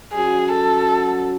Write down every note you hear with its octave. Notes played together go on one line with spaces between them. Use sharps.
F#3 C#4 F#4 G#4
A4